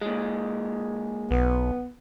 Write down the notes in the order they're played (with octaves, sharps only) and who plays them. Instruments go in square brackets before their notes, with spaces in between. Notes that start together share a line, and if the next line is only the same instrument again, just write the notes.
[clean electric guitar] A#2 G#3
[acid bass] B1 [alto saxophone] B3